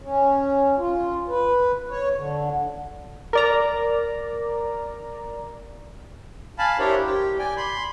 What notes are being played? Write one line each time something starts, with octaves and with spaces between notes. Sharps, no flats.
C#4
F4
B4
C#5
D3
A#4 D5 A#5
F5 G#5 A5 B5
D4 E4 G4 A#4 C5 C#5
G4
D5 G5 G#5
B5 C6